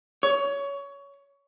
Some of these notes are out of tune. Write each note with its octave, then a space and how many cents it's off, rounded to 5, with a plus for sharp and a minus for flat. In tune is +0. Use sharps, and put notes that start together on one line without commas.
C#5 +20